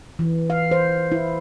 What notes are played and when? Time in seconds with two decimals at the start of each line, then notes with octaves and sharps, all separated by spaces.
0.19 E3
0.50 F5
0.71 C5
1.12 E4